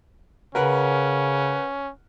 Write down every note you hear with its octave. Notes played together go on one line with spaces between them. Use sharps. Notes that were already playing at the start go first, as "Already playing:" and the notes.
C#3 C#4 A#4 B4 F#5